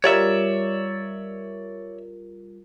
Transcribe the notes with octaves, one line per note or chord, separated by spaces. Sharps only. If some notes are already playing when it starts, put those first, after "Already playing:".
G3 F4 A#4 C#5 D5 E5